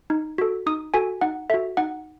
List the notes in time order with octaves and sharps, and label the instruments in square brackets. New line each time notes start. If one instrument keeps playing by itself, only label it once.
[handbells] D#4
F#4 A4
D#4 D#6
F#4 A4 G#5
D#4 F#5
F#4 A4 E5
D#4 F#5